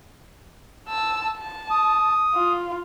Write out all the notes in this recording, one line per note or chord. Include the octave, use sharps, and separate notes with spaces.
A5 E6
A5
D#6
F4